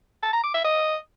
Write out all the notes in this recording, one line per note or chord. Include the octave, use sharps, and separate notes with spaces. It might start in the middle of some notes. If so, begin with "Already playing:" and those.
A5
A#5
D6
E5
D#5